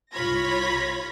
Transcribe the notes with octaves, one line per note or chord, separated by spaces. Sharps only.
C2 F4 C#5 B5 G#6 A#6